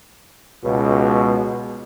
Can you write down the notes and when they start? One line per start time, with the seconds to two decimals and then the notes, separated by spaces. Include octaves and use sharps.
0.64 C#2 B2